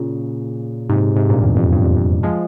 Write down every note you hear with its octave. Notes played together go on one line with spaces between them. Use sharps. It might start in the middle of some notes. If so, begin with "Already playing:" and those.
Already playing: A#2 C#3
G#2 C3
G#2 C3
G2 A#2
E2 G2
F2
G2
F2
F2
F3 G#3